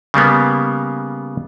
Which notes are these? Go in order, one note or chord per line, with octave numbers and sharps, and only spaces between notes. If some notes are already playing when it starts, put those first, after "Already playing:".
C#3 G3 A#3 B3